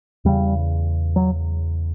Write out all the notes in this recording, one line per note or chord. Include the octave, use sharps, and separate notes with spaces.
E2 C#3 G3
F#3